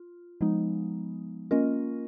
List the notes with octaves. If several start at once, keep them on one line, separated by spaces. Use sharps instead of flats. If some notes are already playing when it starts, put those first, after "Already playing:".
Already playing: F4
F3 G#3 B3 D#4
A#3 C#4 F4 A#4 D#5